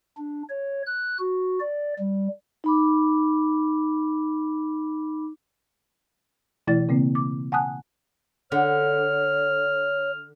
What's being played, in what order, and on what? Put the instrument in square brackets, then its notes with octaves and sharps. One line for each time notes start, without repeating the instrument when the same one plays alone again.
[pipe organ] D4
C#5
F#6
F#4
D5
G3
[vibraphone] D#4 B5 D6
[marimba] B2 E3 A3 E4 D5 A6
C#3 A#3 C4
D6
F#5 G#5 A5 D#6 F#6
[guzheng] D3 [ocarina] C#5 [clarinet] F6